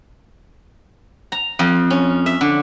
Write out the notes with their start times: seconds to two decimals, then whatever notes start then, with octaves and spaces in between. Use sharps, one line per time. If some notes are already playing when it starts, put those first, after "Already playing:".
1.32 A#5
1.59 F2
1.90 C#4
2.26 E5
2.41 D3